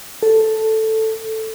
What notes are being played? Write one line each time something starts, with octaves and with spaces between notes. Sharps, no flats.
A4